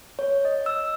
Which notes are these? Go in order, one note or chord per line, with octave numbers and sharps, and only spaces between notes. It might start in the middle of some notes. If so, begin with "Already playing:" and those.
C#5
D#5
E6